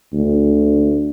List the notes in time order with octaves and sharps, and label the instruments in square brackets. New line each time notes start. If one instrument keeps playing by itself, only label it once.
[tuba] D2